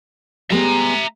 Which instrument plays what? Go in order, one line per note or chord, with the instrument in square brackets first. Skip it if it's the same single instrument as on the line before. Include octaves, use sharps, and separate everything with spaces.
[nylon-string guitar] G3 G#3 B3 [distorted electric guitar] E5 A#5